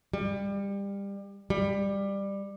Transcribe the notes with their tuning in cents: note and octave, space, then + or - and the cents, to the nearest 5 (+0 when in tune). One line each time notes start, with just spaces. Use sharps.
G3 +25
G3 +15